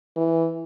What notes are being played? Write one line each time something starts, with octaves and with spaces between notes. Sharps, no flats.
E3